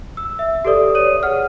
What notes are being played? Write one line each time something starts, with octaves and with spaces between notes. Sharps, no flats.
E6
E5
G4 A4 B4 D5 D#6
C#5 D5 D#6 D#7
G#4 F#5 F6